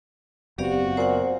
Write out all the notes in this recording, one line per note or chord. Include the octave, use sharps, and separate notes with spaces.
F#1 B3 C4 F#4 G4 D5 F5
A#2 C5 F#5